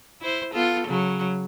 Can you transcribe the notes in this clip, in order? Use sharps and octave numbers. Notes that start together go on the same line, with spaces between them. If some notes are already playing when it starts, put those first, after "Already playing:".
E4 C5
B3 F4 A4
C#3 F#3